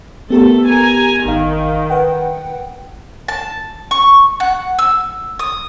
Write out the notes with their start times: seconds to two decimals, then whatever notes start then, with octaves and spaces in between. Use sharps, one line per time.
0.30 A3 B3 G4 A4 A#4
0.68 G#5 A#5
1.26 G#1 D#3 F5
1.90 B4 F#5 G5
3.28 A5
3.91 C#6
4.40 F#5
4.79 E6
5.39 D#6